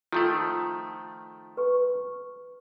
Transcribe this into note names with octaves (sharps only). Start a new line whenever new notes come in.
D#3 F3 A3 F4
B4 C#6